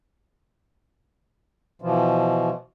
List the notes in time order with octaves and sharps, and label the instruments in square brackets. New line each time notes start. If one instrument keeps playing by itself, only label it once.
[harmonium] B2 E3 F3